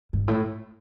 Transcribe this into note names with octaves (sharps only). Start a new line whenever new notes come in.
G2
A2